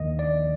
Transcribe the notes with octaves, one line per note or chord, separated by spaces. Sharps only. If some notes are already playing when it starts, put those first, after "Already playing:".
Already playing: D#2 D#3 A#3 D#5
D5